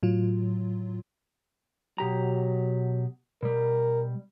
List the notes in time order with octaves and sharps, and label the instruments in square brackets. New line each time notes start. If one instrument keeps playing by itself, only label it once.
[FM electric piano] A2 F#3 F4
[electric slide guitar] B2 G4 A#5 [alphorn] F#3
[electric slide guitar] B2 G3 [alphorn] A#4